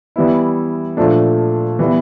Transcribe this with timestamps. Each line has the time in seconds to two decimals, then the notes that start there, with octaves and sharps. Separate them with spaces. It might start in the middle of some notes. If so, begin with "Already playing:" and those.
0.16 E3 G3 B3 E4
0.97 A#2 F3 A3 D4
1.79 E3 G3 B3 E4